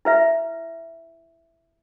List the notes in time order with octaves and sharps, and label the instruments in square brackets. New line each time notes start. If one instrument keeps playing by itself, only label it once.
[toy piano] E4 B4 E5